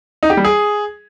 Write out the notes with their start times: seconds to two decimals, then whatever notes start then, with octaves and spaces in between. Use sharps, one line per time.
0.23 D#4
0.30 G4
0.37 G3
0.45 G#4